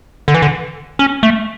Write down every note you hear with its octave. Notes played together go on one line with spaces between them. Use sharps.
D3
E3
D3
C#4
A3